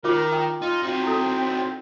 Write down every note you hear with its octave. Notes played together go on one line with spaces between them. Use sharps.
D#3 F4 A#4 C#5 D6
G5
D#4 F4
C4 D#4 F#4
E4 A4